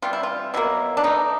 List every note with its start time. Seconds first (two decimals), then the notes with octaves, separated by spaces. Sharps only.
0.02 C3 E3 G3 F4
0.13 E4
0.23 F4
0.54 B2 F#3 A#3 E4
0.97 D4
1.03 E3 A3 D#4